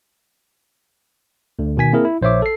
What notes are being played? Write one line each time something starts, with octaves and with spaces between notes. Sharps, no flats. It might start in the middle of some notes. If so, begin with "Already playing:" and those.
D2 D3
B2 D#3 G#5 B6
A#3 C4 E4 G#4 A#4
E4
A#1 C5 C#5 E5 D6
A4 C7